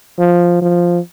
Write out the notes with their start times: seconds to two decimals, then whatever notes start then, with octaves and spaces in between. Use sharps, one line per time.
0.19 F3
0.62 F3